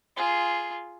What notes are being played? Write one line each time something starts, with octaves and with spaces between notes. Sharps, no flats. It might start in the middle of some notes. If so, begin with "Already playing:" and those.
F4 G#4